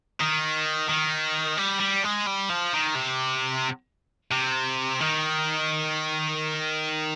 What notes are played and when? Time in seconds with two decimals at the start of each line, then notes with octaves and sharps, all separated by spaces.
0.20 D#3
0.89 D#3
1.57 G3
1.80 G3
2.04 G#3
2.27 G3
2.49 F3
2.73 D#3
2.95 C3
4.32 C3
5.01 D#3